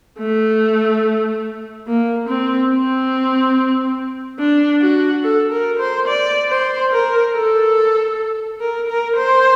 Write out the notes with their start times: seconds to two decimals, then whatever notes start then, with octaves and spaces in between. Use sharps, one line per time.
0.19 A3
1.87 A#3
2.28 C4
2.70 C4
4.39 D4
4.81 F#4
5.23 A4
5.51 A#4
5.79 C5
6.08 D5
6.50 C5
6.92 A#4
7.34 A4
8.60 A#4
8.88 A#4
9.16 C5